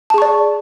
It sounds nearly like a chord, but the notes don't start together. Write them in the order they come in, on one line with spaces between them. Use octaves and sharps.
A5 G#4 C#6 D5